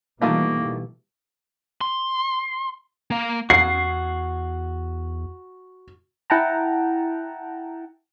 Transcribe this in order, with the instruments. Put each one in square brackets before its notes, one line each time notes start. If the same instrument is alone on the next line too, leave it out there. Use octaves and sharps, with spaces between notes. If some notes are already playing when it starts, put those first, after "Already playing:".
[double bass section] B2 E3 G3 [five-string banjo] D#3 A3 F4 [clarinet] A#3
[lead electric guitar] C6
A#3 F5
[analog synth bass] E2 [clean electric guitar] F#4 [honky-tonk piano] C7
[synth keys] E4 F#5 G5 A5 A#5